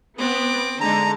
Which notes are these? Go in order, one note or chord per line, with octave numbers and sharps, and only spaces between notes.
B3 C4 D6
D3 G#3 D#4 A5 A#5